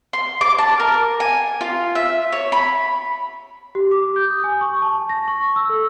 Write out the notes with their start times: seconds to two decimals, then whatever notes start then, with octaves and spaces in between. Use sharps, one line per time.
0.13 C6
0.41 D6
0.58 A5
0.80 A#4
1.20 G#5
1.61 F4
1.95 E5
2.32 C#5
2.52 B5
3.75 G4
3.91 D6
4.16 G6
4.30 D#6
4.44 G#5
4.61 C#6
4.82 A5
5.09 A#6
5.28 C#6
5.56 E6
5.70 A4